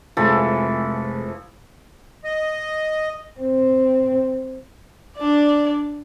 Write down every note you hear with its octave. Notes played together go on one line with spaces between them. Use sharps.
F1 E3 F3 G#3 A4
D#5
C4
D4 D5